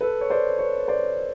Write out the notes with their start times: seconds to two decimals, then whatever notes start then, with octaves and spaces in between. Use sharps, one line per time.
0.01 A4 B4
0.21 C#5
0.30 C5 D5
0.58 B4 C#5
0.88 C5 D5